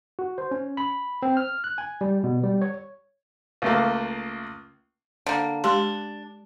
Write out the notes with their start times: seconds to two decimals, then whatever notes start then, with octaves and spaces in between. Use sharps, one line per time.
0.19 F#4
0.38 C5
0.51 C#4
0.77 B5
1.22 C4
1.37 F6
1.64 F#6
1.78 G#5
2.01 G3
2.24 B2
2.43 G3
2.62 C#5
3.62 C#2 A3 A#3
5.26 D3 A#3
5.64 G#3 D4 G4 C6